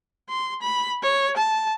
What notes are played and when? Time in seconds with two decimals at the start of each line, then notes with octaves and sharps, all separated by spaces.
0.29 C6
0.62 B5
1.03 C#5
1.37 A5